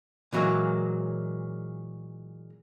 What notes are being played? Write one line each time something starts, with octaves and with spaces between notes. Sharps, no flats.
A#2 E3 F#3 G#3 A#3